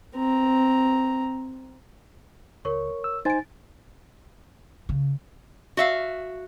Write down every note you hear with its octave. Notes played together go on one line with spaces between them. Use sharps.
C4 A#5
C#2 A#4 C#5 C#6
E6
D#4 C5 G#5 A6 D7
C#3
F#4 E5 F5